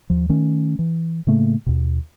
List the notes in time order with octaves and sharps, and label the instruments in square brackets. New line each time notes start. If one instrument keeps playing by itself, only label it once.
[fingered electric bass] D#2 F3
D#3 A3 C#4
E3
A2 C#3 A3 A#3
D#2 B2